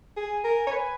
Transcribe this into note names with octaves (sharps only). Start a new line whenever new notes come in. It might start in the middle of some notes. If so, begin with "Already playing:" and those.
G#4 G#5
A#4
C#5
B4